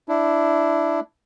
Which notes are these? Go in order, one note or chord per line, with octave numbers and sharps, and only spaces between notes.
D4 E4